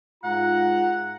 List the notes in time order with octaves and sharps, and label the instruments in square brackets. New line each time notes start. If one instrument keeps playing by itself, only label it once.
[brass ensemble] G#2 F4 A#5 [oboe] F#5